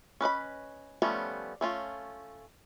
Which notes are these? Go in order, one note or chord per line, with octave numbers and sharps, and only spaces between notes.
C#4 B4 D#5 B5
F3 G3 A3 B3 C#4
A3 C#4 F4